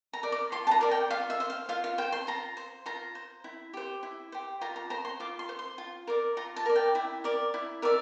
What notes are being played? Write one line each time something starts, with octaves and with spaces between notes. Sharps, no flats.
A#5
A#4 D5
D6
F4 C6
A5
A#5
A#4 D5
G5
F4 F5
E5
C5
F5
F4 F5
F5
C5 G5
C6
F4 A#5
C5
F4 A#5
C5
E4
G4 C5
E4
G4 C5
F4 A#5
A#5
C5 A#5
C6
F4 D6
C6
C5
C6
F4
A#4 D5
F4 A#5
A5
A#4 D5
G5
E4
A#4 D5
E4
A#4 D5 E5